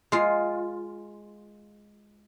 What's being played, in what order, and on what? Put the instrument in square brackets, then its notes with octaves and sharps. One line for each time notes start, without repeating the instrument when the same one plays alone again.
[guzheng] G#3 F4